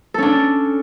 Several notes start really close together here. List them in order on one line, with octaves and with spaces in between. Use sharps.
A4 C#4 D4